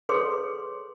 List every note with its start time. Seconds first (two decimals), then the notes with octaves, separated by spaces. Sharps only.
0.09 G#4 A4 B4 C#5 C6